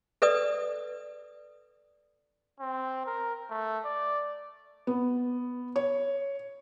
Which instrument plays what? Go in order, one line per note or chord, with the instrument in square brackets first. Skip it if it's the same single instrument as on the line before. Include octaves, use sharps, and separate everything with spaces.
[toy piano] A4 B4 D5 D#6
[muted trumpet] C4
A#4
A3
D5
[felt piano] B3
C#5